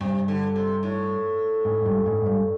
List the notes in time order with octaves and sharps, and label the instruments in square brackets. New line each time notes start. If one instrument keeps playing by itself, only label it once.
[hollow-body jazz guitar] G2 [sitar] C3
[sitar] D3
C3
A2
[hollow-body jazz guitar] G#2
G2
G#2
G2